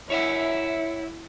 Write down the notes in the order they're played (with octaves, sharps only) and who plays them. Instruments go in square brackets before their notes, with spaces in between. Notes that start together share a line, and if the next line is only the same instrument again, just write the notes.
[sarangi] E4 [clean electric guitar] C#5 E5 F#5